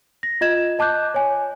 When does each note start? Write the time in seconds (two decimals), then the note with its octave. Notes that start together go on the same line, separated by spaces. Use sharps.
0.23 A#6
0.41 F4 D#5 G#6 E7
0.79 D#5 A5 D6 F#6 G6
1.14 C#5 G#5